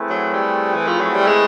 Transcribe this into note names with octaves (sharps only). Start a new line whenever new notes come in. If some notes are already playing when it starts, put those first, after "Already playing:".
Already playing: A3 C4 E4 G#4 B4
F#3
G3
E3
F3
F#3
G3
G#3